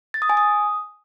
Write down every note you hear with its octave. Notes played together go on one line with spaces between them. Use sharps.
A6
D#6
G#5
D#6